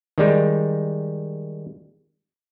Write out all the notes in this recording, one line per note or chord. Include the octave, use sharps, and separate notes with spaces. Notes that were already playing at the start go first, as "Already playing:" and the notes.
D#3 G3 G#3